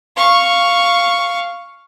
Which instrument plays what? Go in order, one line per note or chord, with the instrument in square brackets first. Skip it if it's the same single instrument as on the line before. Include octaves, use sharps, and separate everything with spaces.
[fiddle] F5 C#6